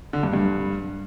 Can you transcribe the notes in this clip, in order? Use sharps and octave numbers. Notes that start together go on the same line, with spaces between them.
D3
G2
G2